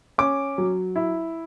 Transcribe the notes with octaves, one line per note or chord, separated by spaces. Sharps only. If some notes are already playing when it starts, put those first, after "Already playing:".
C#4 D6
F#3
E4